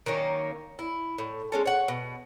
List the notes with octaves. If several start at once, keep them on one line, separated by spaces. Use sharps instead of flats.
D#3 F#3 A#3 C#4
E4
A2
G#3 C#4 A4
C#5 F#5
B2